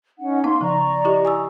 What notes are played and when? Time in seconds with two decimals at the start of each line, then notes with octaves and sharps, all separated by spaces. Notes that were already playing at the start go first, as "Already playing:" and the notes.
0.19 C#4 D#4 F#5
0.44 B3 D#4 F5 C6
0.61 C#3 F3 D5 A#5 C#6
1.05 E4 G4 D#5
1.25 G#5 D#6 E6